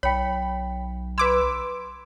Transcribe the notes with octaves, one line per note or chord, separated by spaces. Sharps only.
B1 C#5 G5 B5
B4 C6 D6 E6 G#6